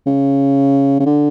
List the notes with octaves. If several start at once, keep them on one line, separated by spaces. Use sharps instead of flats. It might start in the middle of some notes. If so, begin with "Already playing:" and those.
C#3
C#3
D3